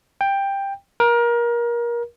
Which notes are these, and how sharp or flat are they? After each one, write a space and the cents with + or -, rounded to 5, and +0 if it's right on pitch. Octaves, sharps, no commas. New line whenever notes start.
G5 +10
A#4 +25